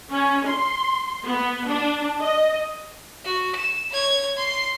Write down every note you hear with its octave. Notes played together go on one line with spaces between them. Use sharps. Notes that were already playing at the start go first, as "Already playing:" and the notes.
C#4
C6
B3
D4
D#5
F#4
E7
C#5 G#6
C6 C7